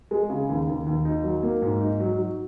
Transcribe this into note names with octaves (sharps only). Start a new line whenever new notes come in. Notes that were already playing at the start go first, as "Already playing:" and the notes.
G#3
C#3
D#2
D#2
D#2
D#4
F#3
A#3
G#2
D#4
F#3
F#3